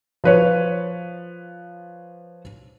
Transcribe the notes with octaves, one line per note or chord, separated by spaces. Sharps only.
F3 B4 C#5